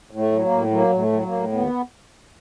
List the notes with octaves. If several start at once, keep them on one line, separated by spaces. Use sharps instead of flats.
A2
A3
F#3
A#3
A2
F#3 A#3
A2
A3
F#3
A#3
A2
D#2 B3